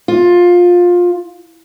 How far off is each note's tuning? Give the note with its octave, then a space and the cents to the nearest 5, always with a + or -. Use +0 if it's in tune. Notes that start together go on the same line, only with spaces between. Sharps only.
F4 +15